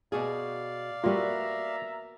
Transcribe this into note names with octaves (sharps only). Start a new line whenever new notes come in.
B2 F#4 G#4 D5 F5
G3 A#3 B3 F4 F#4 E5 A#5